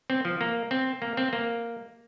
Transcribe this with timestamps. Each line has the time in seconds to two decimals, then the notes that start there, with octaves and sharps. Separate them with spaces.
0.10 C4
0.25 F3
0.41 A#3
0.71 C4
1.02 A#3
1.17 C4
1.33 A#3